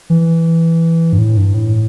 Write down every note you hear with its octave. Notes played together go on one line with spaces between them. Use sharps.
E3
G2
A2
G2
A2